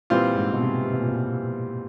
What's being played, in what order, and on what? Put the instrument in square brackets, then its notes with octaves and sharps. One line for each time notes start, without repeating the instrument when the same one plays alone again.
[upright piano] A#2 [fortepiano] E3 G3 C4 F4
[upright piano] G#2
B2
C3
C3
B2
A#2
B2